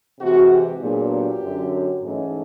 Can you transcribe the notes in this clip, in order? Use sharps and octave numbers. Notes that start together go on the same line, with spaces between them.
C3 E3 G#3 F#4
G4
A#2 F#3 B3 D4 G#4
G4
F#2 D3 F#3
G#2 E3 A3 C#4 D#4